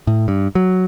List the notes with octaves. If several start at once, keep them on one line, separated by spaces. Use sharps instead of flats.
A2
G2
F#3